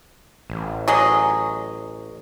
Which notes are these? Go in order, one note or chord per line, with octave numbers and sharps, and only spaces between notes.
A1
F#3 G#4 D#5